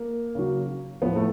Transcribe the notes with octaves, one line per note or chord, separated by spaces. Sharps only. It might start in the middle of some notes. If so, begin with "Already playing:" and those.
Already playing: A#3
C#3 F#3
A2 F3 B3
A3